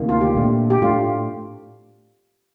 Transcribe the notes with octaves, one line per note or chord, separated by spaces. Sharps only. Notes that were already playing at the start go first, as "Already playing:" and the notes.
Already playing: D2 C3 D#3 A#3
F4
G4
A#2 A3 D4
G4
A2 A3 D4 F4